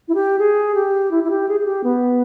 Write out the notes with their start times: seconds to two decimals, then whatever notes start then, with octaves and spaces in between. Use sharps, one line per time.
0.08 E4
0.15 G4
0.39 G#4
0.75 G4
1.11 E4
1.24 E4
1.30 G4
1.48 G#4
1.60 G#4
1.66 G4
1.84 B3